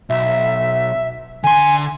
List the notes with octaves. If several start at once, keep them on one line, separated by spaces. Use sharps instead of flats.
B1 E5
D3 G#5 C6